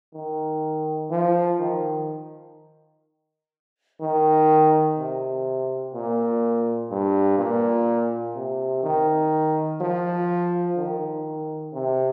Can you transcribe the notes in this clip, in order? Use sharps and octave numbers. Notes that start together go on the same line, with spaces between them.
D#3
F3
D#3
D#3
C3
A#2
G2
A#2
C3
D#3
F3
D#3
C3